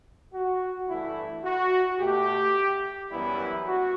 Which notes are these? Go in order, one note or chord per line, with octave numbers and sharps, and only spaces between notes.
F#4
G2 E3 A3 E4
F#4
B2 A3 G4
F#2 E3 G3 B3 E4
F#4